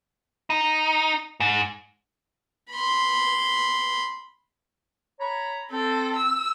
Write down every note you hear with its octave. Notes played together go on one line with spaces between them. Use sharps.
D#4
G#2
B5 C6
C#5 A#5 B5
C4 A4
E6